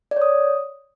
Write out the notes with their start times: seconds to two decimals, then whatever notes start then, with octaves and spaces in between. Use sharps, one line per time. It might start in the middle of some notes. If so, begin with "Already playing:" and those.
0.11 D5
0.16 C#5
0.22 D#6